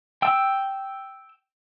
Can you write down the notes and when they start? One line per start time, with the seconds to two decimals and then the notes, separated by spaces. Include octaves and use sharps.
0.22 G5 E6